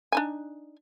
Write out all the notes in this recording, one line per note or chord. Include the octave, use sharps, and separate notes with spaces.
D4 D#4 G#5